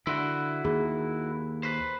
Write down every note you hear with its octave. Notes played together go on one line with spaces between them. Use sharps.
D3 E4 F#4 C6
D#2 G#4 B5
B4 C5